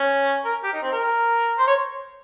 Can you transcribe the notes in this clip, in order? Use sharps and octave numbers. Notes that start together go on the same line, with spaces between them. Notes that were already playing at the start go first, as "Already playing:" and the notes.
Already playing: C#4
A#4
G4
D#4
C4
A#4
C5
C#5